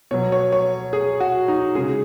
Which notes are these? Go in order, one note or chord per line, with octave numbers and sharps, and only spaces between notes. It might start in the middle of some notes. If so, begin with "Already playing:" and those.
B2 F#3 C#5
C#5
C#5
G#4
F#4
D#4
C#3 G#3 G#4